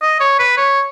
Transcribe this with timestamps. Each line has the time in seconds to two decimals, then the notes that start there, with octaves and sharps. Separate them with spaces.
0.02 D#5
0.20 C#5
0.39 B4
0.57 C#5